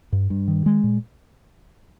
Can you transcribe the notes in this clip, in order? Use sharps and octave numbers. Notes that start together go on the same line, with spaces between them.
G2
G2
D#3
G#3
A#2